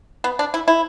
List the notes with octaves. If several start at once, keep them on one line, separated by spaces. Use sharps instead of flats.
B3
D4
E4
E4